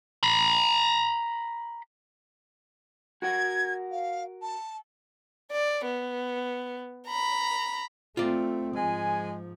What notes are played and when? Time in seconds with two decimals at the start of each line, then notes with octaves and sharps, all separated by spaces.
0.23 A#5 B5
3.22 F#4 A#4 F#5 G#6
3.91 F5
4.41 A5
5.52 D5
5.86 B3
7.07 A#5 B5
8.17 A3 C4 F4 D5
8.76 G#2 F3 G#3 G#5